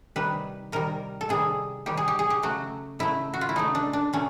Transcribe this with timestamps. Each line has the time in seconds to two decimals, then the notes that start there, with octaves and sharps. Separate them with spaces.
0.16 C3 D#3 G3 B4
0.72 C3 D#3 G3 A#4
1.21 A4
1.29 C3 D#3 G3 G#4
1.86 C3 D#3 G3 G4
1.97 G#4
2.08 G4
2.19 G#4
2.30 G4
2.43 C#3 F#3 A3 F#4
2.99 C#3 F#3 A3 E4
3.34 F#4
3.41 F4
3.49 E4
3.56 C#3 F#3 A3 D#4
3.75 D4
3.93 D4
4.13 C#3 F#3 A3 C#4